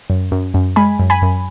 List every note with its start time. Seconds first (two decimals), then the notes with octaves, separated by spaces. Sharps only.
0.10 F#2
0.32 F#2
0.54 F#2
0.76 G#3 G#5 B5
0.99 F#2
1.10 G#5 B5
1.22 F#2